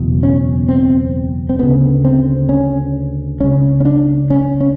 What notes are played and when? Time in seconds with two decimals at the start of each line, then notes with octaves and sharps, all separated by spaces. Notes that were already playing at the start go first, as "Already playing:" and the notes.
Already playing: F#1 E2 B2
0.23 C#4
0.69 C4
1.49 C4
1.59 D2 C#3 B3
2.05 C4
2.49 C#4
3.40 C#2 C#3 C#4
3.80 C#4
3.85 D4
4.30 C#4
4.61 C#4